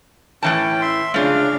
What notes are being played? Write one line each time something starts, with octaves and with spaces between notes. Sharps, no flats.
A2 E3 C#4 G5 A5
E5 C6
C#3 A3 D4 F4 F5